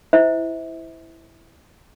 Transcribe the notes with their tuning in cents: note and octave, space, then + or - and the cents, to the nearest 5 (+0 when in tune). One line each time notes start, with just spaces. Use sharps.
E4 +0 C5 -25 E5 -30